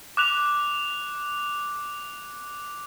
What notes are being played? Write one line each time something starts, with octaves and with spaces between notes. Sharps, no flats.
D6 F#6 F7